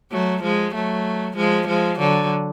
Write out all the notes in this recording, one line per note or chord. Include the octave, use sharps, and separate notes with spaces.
F#3 A3
F3 G#3
F#3 A3
F3 G#3
F3 G#3
D3 F#3